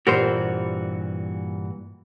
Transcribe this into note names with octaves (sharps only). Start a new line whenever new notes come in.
G2 A#2 E3 F#4 G4 A#4 C5